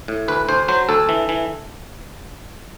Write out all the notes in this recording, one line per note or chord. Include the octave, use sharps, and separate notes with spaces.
A2
D2 B4
D2 C5
F#3 C5
D2 A4
E3
E3